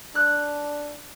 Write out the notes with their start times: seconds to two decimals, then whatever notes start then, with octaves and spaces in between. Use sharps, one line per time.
0.15 D4 F#6